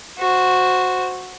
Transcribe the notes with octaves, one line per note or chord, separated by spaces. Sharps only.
F#4 C5